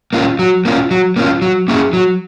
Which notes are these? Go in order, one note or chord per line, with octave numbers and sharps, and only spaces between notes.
A#3 C#4 F4
F#3
A#3 C#4 F4
F#3
A#3 C#4 F4
F#3
A#3 C#4 E4 G#4
F#3